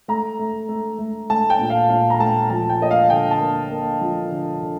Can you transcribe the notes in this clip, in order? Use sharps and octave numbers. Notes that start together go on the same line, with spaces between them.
A3 A#5
A3
A3
A3
A3 A5
G5
A#2
F5
A#2 F5
A#5
A3 A5
F3 A5
G5
A#3 D#5
F5
D3 G5
A5
A#3
A#3
F3
D3
D3